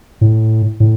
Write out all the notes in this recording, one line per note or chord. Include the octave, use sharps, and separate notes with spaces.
A2
A2